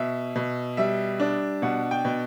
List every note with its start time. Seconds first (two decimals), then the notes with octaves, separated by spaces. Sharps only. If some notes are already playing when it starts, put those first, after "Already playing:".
Already playing: B2 E5
0.36 B2
0.77 G3 E5
1.20 D4
1.62 B2 F#5
1.91 G5
2.05 B2